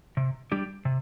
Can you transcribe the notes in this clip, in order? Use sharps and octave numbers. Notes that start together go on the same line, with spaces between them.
C3
G3 D4 G4
C3